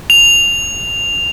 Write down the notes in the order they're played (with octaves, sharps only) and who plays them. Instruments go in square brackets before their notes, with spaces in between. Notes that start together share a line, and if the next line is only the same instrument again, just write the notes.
[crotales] F7